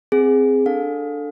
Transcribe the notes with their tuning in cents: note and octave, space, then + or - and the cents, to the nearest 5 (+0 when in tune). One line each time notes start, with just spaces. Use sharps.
C4 +0 G#4 +0
D4 +0 A4 +10 F5 +30